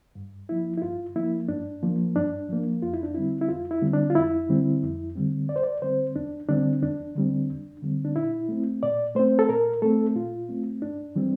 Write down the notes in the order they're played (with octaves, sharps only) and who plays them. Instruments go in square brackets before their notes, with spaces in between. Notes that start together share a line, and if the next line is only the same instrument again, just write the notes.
[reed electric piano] G2
F3 A#3 E4
E4
G2 F4
F3 A#3 E4
G2 D4
F3 A#3
G2 D4
F3 A#3
F2 F4
E4
D4
D3 G3 C4 E4
E4
F2 F4
E4
D3 G3 C4
D4
F4
F2 E4
D3 G3 C4
F2
D3 G3 C4
E2 D5
C5
D5
D3 G3 C4 C5
E2 D4
D3 G3 C4 D4
E2 D4
D3 G3 C4
E2
D3 G3 C4
D4
A#2 E4
A3 C4
A#2 D5
A3 C4 C5
A4
A#2 A#4
A3 C4 A4
A#2 F4
A3 C4
G2 D4
E3 G3 C4